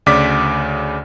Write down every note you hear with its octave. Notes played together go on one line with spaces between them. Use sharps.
D2 C#3 D5 D6 B6